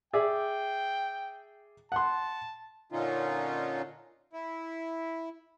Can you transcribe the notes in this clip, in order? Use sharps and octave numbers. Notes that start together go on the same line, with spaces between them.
G#4 D5 E5 G5
F#5 A5 C6
A#2 D3 C#4 D#4 F4
E4